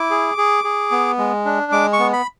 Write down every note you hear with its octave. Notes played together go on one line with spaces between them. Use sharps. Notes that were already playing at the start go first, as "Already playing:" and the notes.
Already playing: E4 D6
G#4
G#4
G#4
B3
G#3
D4
G#3 D6
C#6
B3
B5